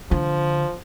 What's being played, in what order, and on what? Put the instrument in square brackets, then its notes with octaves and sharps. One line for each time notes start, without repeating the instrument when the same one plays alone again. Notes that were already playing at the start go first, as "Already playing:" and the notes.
[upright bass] D3 [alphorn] F3